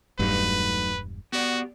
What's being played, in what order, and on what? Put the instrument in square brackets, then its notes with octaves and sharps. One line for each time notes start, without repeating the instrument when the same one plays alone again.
[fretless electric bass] E1 G2 [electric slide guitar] F#3 A3 D#4 [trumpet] B4
[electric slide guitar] B3 G4 D5 [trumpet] F#4